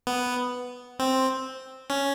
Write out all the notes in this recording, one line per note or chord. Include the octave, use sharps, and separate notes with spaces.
B3
C4
C#4